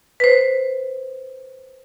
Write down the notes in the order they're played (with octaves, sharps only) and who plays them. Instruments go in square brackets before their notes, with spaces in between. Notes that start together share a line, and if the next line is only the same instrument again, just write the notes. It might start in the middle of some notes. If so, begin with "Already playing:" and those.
[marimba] B4 C5